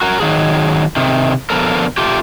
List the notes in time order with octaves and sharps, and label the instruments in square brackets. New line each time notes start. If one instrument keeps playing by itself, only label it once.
[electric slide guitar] F#4 A#4
D#3 F3 F#3 G#4
C3 D#3
D3 F3 B3 A4 A#4
A3 F4 G4